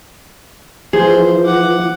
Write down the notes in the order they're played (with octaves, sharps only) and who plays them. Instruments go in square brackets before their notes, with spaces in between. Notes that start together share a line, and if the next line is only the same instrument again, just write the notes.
[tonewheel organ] E3 F3 [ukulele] G#4 [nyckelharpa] C5
[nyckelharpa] F#5 D6